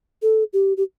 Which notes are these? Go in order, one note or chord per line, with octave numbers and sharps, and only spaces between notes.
A4
G4
G4